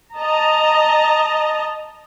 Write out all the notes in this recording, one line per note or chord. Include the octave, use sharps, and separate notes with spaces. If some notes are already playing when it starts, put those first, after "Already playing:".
D#5 A5 A#5